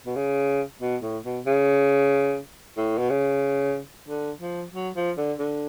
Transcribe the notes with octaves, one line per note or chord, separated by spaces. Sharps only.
B2
C#3
B2
A2
B2
C#3
A2
B2
C#3
D3
F3
F#3
F3
D3
D3